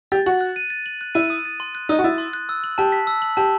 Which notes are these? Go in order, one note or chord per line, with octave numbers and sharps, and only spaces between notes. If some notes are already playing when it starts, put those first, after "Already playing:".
G4 A6
F#4 F#7
F#6
D#7
A6
F#7
F#6
E4 D#7
D#6
A6
C6
F#6
D#4 D#6
F#4
E4 A6
C6
F#6
E6
F#7
G4 A5
B6
E6
F#7
G4 A5